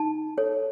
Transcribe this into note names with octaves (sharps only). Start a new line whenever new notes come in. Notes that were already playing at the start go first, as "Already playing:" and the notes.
Already playing: D#4 A5
A4 C#5